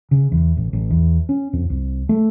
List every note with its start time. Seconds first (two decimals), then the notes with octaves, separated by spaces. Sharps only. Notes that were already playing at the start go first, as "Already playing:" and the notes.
0.11 C#3
0.32 E2
0.57 A1
0.73 A1
0.90 E2
1.29 C#4
1.53 F2
1.70 C2
2.09 A3